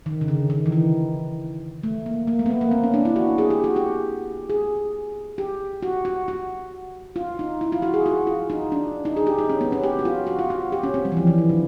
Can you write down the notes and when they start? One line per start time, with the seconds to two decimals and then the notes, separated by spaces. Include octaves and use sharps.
0.06 D#3
0.21 C#3
0.28 D3
0.50 D#3
0.66 E3
0.72 D#3
1.83 A3
2.06 A#3
2.27 A#3
2.39 A3
2.46 B3
2.50 A#3
2.61 A#3
2.71 C4
2.84 C#4
2.94 D4
3.05 E4
3.16 F#4
3.38 G#4
3.50 G4
3.64 F#4
3.76 G4
4.50 G#4
5.38 G4
5.83 F#4
6.05 F#4
6.28 F#4
7.16 F4
7.39 D#4
7.61 E4
7.72 F4
7.82 F#4
7.94 G#4
8.06 F#4
8.27 F4
8.50 D#4
8.72 D4
9.05 D#4
9.16 G#4
9.27 G4
9.39 D#4
9.50 C#4
9.61 B3
9.72 C#4
9.83 G4
9.99 F#4
10.05 F4
10.27 F#4
10.39 F4
10.50 F#4
10.72 G4
10.83 C#4
10.94 C4
11.05 G3
11.12 E3
11.17 F3
11.27 E3
11.38 D#3
11.49 D3